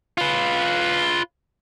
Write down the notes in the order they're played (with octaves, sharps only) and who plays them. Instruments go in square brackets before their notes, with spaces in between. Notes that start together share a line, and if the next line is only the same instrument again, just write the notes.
[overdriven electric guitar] F4 B4